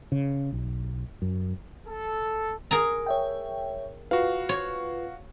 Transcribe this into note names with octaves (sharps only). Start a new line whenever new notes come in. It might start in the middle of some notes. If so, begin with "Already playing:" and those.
C#3
B1
F#2
A4
G#4 A#4 A#5
C#5 E5 G5
F4 F#4 B4 F5
C#5